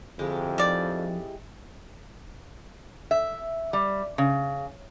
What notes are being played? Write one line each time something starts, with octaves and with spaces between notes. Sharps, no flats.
F2 D3 G#3 E4 G4
D#3 F3 D5
E5
G3
C#3